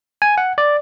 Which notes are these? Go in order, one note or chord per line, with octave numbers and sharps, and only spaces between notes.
G#5
F#5
D5